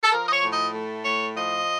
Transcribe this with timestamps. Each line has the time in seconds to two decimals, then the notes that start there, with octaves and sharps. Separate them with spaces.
0.03 A4
0.11 F3 A#4
0.26 D#5
0.32 C#5
0.42 A2
0.52 D#5
0.73 A3
1.04 A2 C#5
1.35 F3 D#5